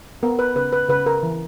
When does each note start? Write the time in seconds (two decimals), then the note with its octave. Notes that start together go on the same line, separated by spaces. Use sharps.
0.23 B3 A#4
0.39 B4
0.55 C#3 B4
0.73 B4
0.89 C#3 B4
1.06 A#4
1.23 E3